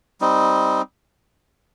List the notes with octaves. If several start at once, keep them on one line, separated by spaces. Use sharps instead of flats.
G3 C4 D#4